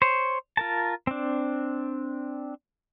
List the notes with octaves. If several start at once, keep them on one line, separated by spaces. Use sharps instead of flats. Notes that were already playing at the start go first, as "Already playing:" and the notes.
C5 C#5
F4 A#4 A5
C4 D4